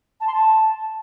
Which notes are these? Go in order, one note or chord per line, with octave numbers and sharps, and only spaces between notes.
A5
C6
A5